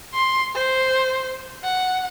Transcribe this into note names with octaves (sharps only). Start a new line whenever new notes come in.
C6
C5
F#5